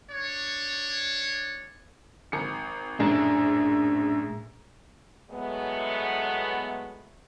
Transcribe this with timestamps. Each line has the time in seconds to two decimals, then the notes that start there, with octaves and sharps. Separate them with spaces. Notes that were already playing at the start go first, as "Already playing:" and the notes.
0.10 D4 C#5
2.32 G#1 C#7
3.00 A#1 F#2 A2 D4 G#4
5.30 A2 F#3 G#3 A3 B3